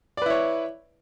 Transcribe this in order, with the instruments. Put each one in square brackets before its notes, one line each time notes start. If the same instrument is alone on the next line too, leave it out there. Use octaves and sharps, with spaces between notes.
[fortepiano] D5
B4
E4
C#5